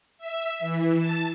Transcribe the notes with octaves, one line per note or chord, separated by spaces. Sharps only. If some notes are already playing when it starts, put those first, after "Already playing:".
E5
E3
A5